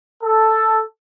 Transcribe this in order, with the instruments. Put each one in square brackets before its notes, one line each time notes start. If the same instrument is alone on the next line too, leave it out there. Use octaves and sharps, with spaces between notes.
[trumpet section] A4